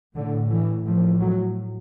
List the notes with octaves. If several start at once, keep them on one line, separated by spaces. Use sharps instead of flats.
A2 D3
E3
A2 F3
F#3